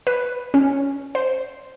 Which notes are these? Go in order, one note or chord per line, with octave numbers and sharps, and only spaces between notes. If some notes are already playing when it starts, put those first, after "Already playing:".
B4
C#4
C5